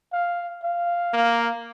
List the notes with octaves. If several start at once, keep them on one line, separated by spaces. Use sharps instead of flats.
F5
F5
A#3